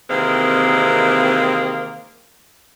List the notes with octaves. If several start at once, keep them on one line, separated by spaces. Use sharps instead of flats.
C3 D#3 E3 G#3 A#3 C4